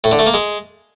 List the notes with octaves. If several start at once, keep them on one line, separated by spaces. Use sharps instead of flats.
A2
D3
A3
A#3
G#3